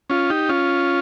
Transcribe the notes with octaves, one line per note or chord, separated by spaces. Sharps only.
C#4 F4
D#4 G4
C#4 F4